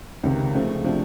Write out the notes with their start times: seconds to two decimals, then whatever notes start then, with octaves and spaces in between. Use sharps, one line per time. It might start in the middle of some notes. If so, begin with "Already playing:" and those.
0.23 C#2 C3 D#3
0.55 C#3 F3 A3 C4
0.84 C3 F3 A3 D4